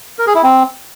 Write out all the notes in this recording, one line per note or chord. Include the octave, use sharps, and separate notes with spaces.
A#4
G#4
E4
C4